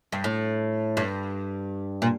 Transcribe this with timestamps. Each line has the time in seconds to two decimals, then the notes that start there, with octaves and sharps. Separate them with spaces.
0.12 G2
0.24 A2
0.97 G2
2.02 A#2